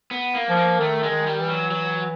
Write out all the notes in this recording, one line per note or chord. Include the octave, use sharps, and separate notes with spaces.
B3
A#3
F3
A#3
D#3 A3
G#3
D#3
G3
E3
F#3
F#3